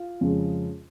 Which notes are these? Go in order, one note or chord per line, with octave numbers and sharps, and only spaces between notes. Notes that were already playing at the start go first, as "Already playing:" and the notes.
Already playing: F4
F2 C#3 G#3